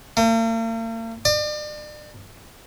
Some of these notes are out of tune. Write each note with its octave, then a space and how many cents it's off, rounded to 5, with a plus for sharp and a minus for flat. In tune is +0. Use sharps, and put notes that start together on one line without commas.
A#3 -45
D5 +40